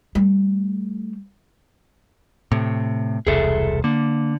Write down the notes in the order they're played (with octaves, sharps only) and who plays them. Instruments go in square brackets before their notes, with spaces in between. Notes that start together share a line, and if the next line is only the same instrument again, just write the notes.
[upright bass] G3 A3
[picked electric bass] A2 C3
[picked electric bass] E1 C2 [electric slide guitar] G#4 A4 E5
[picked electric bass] D3 [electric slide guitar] A#3